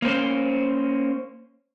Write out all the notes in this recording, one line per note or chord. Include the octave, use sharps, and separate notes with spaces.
A#3 C#4 C5